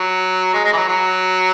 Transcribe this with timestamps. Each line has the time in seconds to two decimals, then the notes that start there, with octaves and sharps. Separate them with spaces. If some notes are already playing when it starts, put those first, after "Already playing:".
Already playing: F#3
0.54 G#3
0.64 G#3
0.73 E3
0.77 F#3
0.88 F#3